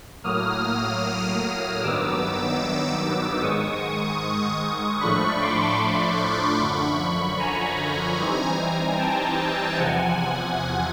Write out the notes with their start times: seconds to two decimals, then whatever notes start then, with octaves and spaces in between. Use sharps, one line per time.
0.24 A2 F#3 A#3 D#6 F6
1.83 G2 D#3 F#3 B3 D#4 D6 E6
3.41 G#2 D#3 G#3 C#6 D#6
5.00 A2 F3 A3 D4 B5 C#6
5.40 C6 D6
5.80 B5 C#6
6.60 F#2 D3 F3
7.39 G#5 A#5
8.19 E3 G3 C4 D#4
8.98 G5 A5
9.77 E2 C3 F3 F#5 G#5